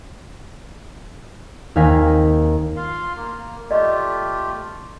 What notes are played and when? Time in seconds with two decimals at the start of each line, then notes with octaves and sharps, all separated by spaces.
1.76 D#2 C4 F5 G#5 A#6 B6
2.76 F4 F5 C6
3.17 A#3
3.71 A3 F4 G4 D5 D#5